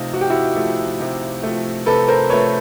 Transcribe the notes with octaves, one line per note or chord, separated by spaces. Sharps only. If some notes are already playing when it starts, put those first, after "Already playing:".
Already playing: C3 F3 A3 D#4 F4
C3 F#4
G4
E4 F#4
F3 A3
C3
F3 A3
C3 A4 B4
A#4 C5
F3 A3 B4 C#5